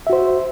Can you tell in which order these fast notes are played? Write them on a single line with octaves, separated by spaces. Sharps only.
E5 F#4 C5